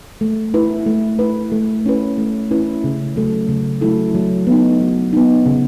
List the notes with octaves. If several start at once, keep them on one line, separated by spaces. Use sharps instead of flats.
A3
E4 B4
A3
E4 B4
A3
C#4 E4 B4
A3
C#4 E4 B4
C#3
F#3 A3 E4 A4
C#3
F#3 A3 E4 A4
F#3
B3 D#4
F#3
B3 D#4
C#3